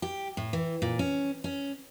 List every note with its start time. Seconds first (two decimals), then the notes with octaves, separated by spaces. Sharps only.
0.02 G4
0.37 A2
0.53 E3
0.82 A#2
0.99 C#4
1.44 C#4